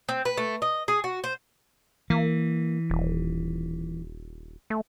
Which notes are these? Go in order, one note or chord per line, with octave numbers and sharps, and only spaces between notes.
C4
B4
A3
D#5
G#4
F#4
C5
E3 A#3
D#1
A3